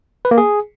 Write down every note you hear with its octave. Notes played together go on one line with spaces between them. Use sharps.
B4
A#3
G#4